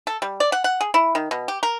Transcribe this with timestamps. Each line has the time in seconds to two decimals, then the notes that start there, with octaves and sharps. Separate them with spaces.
0.07 A4
0.22 G3
0.40 D5
0.52 F#5
0.64 F#5
0.81 G#4
0.94 E4
1.15 D#3
1.31 B2
1.48 G4
1.63 A#4